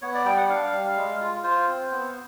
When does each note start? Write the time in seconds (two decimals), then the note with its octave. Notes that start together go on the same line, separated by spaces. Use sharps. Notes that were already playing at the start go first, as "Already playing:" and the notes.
0.02 B3 C#5
0.14 D5
0.25 G3 G5
0.37 F#5
0.49 D4 F5
0.72 G3
0.96 G#3
1.21 F4
1.43 F4 C5
1.68 C4
1.91 B3